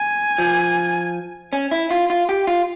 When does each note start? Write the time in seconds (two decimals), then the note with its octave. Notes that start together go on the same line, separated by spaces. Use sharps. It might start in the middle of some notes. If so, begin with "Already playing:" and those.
Already playing: G#5
0.38 F3
1.53 C#4
1.71 E4
1.91 F4
2.10 F4
2.29 G4
2.47 F4